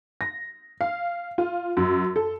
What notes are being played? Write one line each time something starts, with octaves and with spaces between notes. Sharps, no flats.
A#6
F5
F4
F#2
A4